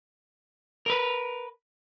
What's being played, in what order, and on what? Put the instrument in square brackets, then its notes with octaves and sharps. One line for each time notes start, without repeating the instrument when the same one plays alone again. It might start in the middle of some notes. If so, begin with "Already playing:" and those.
[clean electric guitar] A#4 B4